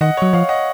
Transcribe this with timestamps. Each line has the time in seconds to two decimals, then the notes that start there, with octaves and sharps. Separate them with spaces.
0.01 D#3 D#5 F#5
0.17 F#3 C#5
0.33 F3 C#5 F5
0.49 D#5 F#5